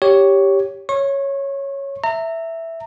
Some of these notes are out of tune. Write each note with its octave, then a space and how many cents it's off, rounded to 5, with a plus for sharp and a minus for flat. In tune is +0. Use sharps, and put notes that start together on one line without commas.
G4 +0 C#5 +5
C#5 -5 C#6 -35
E5 +0 A#5 -30